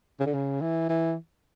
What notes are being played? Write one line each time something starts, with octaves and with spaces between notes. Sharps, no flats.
C#3
D3
C#3
E3
E3